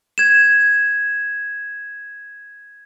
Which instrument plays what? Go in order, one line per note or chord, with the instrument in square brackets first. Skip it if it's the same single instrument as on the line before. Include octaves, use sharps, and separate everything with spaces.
[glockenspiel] G#6 E7